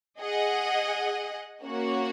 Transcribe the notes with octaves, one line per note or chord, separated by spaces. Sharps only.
G#4 D#5 F#5
A#3 C#4 F#4 C#5 F#5